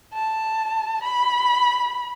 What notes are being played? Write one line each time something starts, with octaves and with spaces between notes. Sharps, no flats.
A5
B5